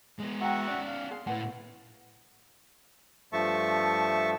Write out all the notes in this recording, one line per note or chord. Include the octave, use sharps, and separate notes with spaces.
G#3 B3
F#4 E5 F#5 G5 A#5
C#4 D5
F5
G#4 F5 C6
A2 E4 B4 F#5
G2 F3 A3 E5 A5 C#6